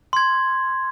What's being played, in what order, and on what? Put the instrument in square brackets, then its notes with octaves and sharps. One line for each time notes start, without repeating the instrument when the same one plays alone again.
[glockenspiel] C6 G#6